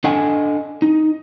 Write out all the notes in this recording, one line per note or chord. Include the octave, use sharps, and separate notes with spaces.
D4 A4 D#5 F#5 G#5 A5
D#4